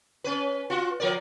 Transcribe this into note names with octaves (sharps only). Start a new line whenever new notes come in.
C#4 B4
F4 F#4
F3 A#4 D5